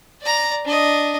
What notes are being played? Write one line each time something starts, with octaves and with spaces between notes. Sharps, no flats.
D5 A#5
D4 D#5